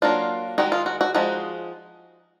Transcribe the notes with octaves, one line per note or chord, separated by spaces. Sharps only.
F#3 A#3 D4 F4
D#3 G#3 D#4 F#4
F4
F#4
F#4
F3 G#3 D#4 F#4